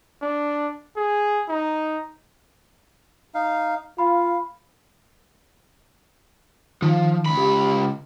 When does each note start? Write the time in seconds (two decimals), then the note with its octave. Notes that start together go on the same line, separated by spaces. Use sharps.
0.22 D4
0.97 G#4
1.49 D#4
3.34 D#4 F5
3.98 F4 F5 B5
6.82 D#3 F3
7.26 C#2 B5
7.37 G4